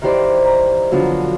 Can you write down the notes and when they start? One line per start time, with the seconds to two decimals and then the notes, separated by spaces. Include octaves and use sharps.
0.02 D#3 E3 G4 C5 D5
0.45 A#5
0.92 D3 F3 F#3 B3